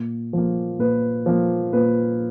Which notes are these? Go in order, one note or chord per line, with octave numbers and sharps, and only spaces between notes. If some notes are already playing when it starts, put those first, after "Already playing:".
Already playing: A#2
F3 A#3
A#2 B4
F3 A#3
A#2 B4